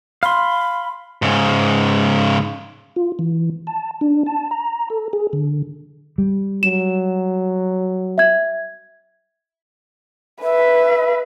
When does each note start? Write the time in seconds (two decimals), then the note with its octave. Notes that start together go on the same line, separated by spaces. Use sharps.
0.23 F5 B5 C6
1.22 G#2 C#3
2.96 F4
3.19 E3
3.67 A5
4.01 D4
4.26 A5
4.51 A#5
4.90 A4
5.13 G#4
5.33 D3
6.18 G3
6.63 F#3 E7
8.18 E5 G#6
10.43 B4 E5